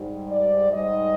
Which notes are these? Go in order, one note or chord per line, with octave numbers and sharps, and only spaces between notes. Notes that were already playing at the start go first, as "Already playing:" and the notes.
Already playing: G#2 G3
D5
G#2 G3 D#5